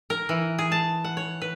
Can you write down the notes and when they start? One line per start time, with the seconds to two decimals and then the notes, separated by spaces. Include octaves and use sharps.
0.10 A#4
0.29 E3
0.59 G#4
0.72 A5
1.04 F#5
1.17 C#5
1.42 B4